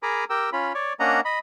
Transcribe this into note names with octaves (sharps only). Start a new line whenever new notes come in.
G#4 A#4 G#5 A#5 B5 D6
G4 A#4 G5 E6
C#4 F4 B5
C#5 D5
A#3 C#4 D4 D#5 F#5 A#5
D#5 B5